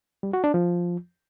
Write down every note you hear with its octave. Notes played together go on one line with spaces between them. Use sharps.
G3
F#4
D4
F3